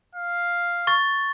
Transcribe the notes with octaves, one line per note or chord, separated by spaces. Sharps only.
F5
C#6 A6